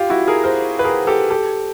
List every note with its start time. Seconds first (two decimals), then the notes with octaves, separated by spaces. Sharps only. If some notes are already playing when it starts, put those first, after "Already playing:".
Already playing: F4 G4
0.10 E4 F#4
0.27 G#4 A#4
0.44 A#4 C5
0.79 B4
0.84 G#4 A#4
1.07 G4 A4
1.30 G4 A4